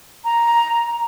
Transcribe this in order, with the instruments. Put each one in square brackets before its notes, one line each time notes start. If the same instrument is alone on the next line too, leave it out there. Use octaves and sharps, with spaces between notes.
[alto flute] A#5